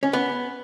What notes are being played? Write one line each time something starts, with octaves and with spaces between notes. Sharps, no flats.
C#4
B3